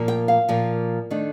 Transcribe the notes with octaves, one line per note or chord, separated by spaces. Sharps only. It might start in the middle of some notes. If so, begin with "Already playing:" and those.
Already playing: A#2 F3 A#3
G5
F5
A#2 F3 A#3
D#3 A3 D4